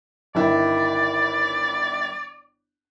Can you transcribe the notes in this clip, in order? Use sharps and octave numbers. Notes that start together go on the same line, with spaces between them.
G1 D#3 E4 D5